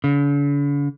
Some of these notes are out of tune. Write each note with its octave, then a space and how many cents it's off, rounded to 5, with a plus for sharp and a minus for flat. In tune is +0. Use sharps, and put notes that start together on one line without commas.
D3 -45